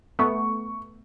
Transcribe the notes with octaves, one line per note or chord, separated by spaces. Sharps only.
A3 B3 C#6